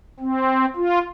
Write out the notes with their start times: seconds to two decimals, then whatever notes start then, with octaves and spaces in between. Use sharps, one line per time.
0.20 C4
0.76 F4